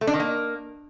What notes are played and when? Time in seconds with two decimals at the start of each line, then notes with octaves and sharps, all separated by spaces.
0.01 A3
0.07 D4
0.14 D#3
0.20 A#3